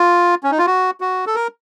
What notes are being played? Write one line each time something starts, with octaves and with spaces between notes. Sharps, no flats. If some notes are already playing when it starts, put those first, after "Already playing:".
Already playing: F4
C#4
D#4
F4
F#4
F#4
A4
A#4